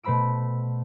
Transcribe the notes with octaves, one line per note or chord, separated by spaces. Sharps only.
B2 A3 C5 B5 E6 D7